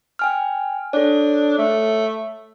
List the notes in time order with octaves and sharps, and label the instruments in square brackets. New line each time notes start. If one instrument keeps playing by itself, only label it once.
[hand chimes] G5 G#5 F6
[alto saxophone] D4 [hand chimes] A4 C#5
[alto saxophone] A3